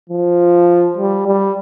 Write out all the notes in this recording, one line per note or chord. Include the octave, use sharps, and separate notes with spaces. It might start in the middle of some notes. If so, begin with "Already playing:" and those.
F3
G3
G3